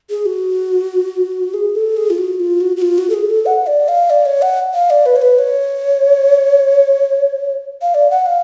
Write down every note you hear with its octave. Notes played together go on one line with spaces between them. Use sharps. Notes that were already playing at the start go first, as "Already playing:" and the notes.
G#4
F#4
G#4
A4
G#4
F4
F#4
F4
F#4
F#4
F4
F#4
A4
G#4
A4
F#5
D5
F5
D5
C#5
F#5
F5
D5
B4
C#5
B4
C#5
F5
D5
F#5
F5